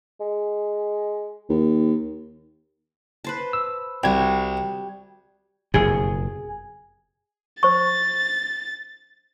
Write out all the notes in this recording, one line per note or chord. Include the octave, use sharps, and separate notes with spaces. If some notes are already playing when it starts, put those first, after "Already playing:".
G#3
D#2
B4 C5 A5
E6
C2 G3 F#4 G5 G#6
F#1 F2 B2 G#4
C5 C#6 A6